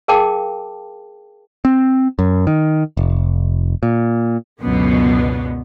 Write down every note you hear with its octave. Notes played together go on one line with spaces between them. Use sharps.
G#4 A#4 F5 G5 A5 D6
C4
F#2
D#3
F1
A#2
C#2 F#2 B2 D3 B3